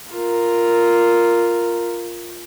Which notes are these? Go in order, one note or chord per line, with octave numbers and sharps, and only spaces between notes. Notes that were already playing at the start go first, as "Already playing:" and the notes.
F4 A#4